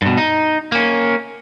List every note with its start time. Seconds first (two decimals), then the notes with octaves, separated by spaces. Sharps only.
0.02 G2 B2
0.18 D#4
0.72 A#3 C#4